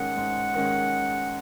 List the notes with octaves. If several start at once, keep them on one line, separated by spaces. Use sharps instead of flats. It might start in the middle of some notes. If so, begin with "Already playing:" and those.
Already playing: G#2 D#3 G#3 C#4 F#5
G#2
D#3 G#3 C#4